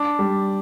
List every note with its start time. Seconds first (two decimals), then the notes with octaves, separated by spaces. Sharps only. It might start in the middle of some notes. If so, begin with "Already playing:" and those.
Already playing: D4
0.19 G3